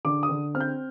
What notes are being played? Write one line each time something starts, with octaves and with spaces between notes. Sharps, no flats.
D3 D6
D#6
D3
C4 F6
G6